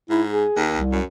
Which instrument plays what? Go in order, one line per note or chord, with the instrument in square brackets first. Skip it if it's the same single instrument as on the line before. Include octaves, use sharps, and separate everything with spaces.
[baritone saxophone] G#2 [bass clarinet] E4
[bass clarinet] G#4
[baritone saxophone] D#2
[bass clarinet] C2
[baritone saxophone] F#2